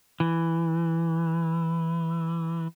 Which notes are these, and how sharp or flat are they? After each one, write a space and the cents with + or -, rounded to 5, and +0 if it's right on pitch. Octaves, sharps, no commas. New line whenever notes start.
E3 +5